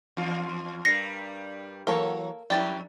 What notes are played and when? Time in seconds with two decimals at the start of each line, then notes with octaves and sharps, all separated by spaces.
0.17 E2 F4
0.85 G2 G3 A#4 A#6 C7 C#7
1.87 E3 F#3 A#3 A4 A#4 C#5
2.50 F2 E3 G3 G4 D5 A6